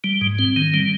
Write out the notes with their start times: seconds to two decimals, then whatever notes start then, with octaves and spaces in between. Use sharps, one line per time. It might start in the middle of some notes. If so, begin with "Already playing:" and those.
0.04 G3
0.21 G#2
0.39 C4
0.56 D#3
0.74 G3